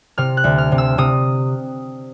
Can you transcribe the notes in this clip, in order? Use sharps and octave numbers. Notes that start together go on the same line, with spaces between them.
C3 F6
F#6
D2
F6
C3
E6
C3 D#6